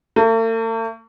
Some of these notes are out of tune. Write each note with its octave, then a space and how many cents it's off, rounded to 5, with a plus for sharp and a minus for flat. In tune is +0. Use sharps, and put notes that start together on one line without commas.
A3 +45